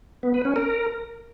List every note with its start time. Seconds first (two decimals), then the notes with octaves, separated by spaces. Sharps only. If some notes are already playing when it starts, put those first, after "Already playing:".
0.23 B3
0.34 B4
0.45 C#4
0.56 A#4